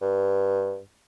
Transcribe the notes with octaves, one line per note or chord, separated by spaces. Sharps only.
G2